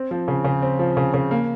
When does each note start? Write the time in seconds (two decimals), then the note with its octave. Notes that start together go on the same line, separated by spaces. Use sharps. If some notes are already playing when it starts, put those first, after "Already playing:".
Already playing: C4
0.11 F3
0.28 C#3
0.45 C#3
0.62 C4
0.79 F3
0.97 C#3
1.14 C#3
1.31 A#3